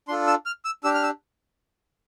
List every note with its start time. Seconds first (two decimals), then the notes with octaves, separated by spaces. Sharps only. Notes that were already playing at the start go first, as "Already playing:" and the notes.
0.08 D4 F4 A4 C6
0.27 E6
0.46 F6
0.65 E6
0.84 D4 G4 E6
0.94 F6
1.03 E6